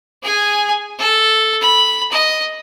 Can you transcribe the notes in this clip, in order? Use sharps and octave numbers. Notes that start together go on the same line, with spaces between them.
G#4 G#5
A4
B5
D#5